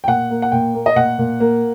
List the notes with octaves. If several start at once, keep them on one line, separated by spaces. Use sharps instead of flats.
G5
A#2 F#5
A#3
F#5
A#2 G5
A#3
D#5
A#2 F#5
A#2
A#3